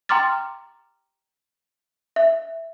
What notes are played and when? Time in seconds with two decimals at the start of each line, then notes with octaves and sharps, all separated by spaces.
0.09 G5 A#5 C6 D6 F6 A6
2.16 E5